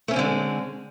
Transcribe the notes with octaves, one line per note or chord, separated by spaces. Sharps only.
D3 G#3 A3 C4 C#4